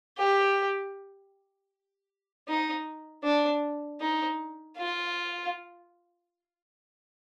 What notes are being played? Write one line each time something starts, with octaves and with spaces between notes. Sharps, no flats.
G4
D#4
D4
D#4
F4